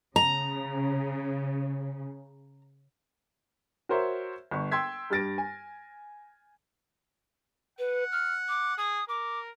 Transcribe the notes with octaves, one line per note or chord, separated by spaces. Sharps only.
C#3 A#5
F#4 A#4 C5 C#5 E5
G1 C#6
G5 C6 E6 G#6 B6
G2 G4 F6 A6 A#6 D7
G#5
B4 F#5
F6
D6
G#4 D#6
A#4 D6